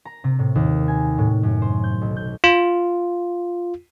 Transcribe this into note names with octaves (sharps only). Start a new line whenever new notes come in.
A#5
C3
A2
D#2
G#5
A2
F#2
C5
G6
B1
G6
F4